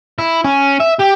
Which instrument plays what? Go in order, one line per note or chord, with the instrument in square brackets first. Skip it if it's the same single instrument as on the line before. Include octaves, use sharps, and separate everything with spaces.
[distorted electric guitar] E4
C#4
E5
G4